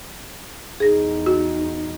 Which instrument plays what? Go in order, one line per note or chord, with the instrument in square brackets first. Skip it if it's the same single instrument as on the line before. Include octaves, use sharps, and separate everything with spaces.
[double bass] E2 D#4 [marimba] G#4 A#6
[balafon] F#4